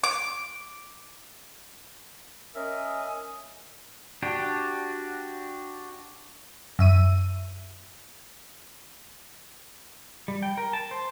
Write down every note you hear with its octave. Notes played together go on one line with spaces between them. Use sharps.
D6
C#4 A#4 D#5 E5 G#5
D4 F#4 G4
F#2 E5 D#7
G3
G5
A#4
A5
C5